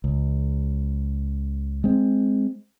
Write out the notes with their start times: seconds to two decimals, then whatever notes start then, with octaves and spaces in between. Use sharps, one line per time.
0.04 C#2
1.84 G#3 C4